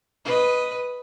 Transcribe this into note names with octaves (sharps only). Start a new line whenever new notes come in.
B4 D#5